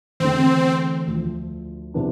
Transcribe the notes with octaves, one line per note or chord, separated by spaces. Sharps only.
E2 D3 A3 C4
D2 D3 F3
C3 E3 B3 D4